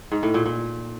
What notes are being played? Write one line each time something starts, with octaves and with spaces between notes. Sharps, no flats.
G#2
A2
A#2
A#2